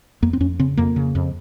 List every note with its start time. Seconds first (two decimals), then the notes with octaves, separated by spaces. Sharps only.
0.23 F2 A#3
0.33 C4
0.41 F2 C#4
0.60 C#3 C4
0.77 F2 A#3
0.96 C#3
1.15 F2